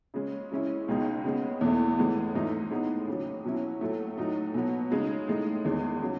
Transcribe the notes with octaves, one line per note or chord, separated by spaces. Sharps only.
C#3 G#3 C#4
C#3 G#3 C#4 E4
C#2 B2 G#3 D#4
C#3 G#3 B3
E2 B2 A3 E4
A2 E3 G#3 B3
G#2 E3 A3 D#4
A2 G#3 B3 D#4
D#2 C#3 F#3
B2 F#3 C#4 E4
A2 F#3 A3
A2 F#3 A3 D#4
B2 F#3 B3
C#3 G#3 D#4
A2 G#3 D#4
E2 D#3 G#3
C#3 F#3